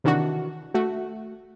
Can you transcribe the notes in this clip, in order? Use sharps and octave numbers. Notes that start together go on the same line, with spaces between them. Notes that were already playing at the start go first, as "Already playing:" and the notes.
C3 D#3 E3 D4 F#4
A3 F#4